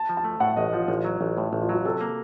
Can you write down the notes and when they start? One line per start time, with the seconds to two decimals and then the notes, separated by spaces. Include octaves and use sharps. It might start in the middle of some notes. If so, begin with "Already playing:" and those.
Already playing: A5
0.09 F3
0.17 A5
0.24 A3
0.40 A2 F#5
0.56 A1 D#5
0.73 F3 F4
0.88 A1
1.05 F#3
1.21 A1
1.37 A2
1.53 A1
1.61 F4
1.69 F#3 F#4
1.85 C3 A4
2.01 A#3